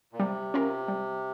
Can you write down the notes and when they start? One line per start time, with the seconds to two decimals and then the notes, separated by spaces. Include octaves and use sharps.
0.13 A#2
0.19 C3 G3
0.54 C#4 F4 A#4
0.88 G3